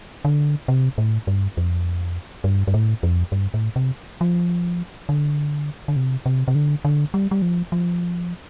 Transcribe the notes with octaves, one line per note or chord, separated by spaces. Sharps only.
D3
C3
A2
G2
F2
G2
G2
A2
F2
G2
A2
C3
F3
D3
D3
C3
C3
C3
D3
D3
G3
G3
F3
F3